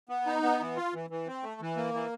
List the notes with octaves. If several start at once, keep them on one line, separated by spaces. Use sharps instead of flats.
B3
D#4
B3
E3
F4
E3
E3
C4
A3
E3
A#3
E3